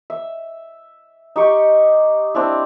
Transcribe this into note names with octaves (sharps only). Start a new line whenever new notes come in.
E5
D#4 G4 C#6
C4 D4 E4